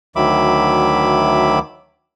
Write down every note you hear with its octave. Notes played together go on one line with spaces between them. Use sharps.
D2 D#3 F#3 E5 B5 D6